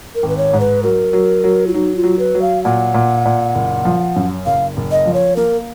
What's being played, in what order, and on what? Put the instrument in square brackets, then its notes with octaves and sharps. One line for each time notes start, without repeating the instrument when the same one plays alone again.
[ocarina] A#4
[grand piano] G#1 [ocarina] B4
[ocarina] C#5
[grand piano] G#2
[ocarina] B4
[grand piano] F#3 [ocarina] A#4
[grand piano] F#3
F#3
[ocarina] F4
[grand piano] F#3 [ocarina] D#4
[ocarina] F4
[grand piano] F#3
[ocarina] B4
[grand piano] F#3
[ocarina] F5
[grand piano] A#2 [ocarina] F#5
[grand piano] A#2
A#2
F#1
F3
F#2
[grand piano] F#1 [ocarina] F5
[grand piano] F#1
[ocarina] D#5
[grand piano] F3
[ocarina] C#5
[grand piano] A#3 [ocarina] A#4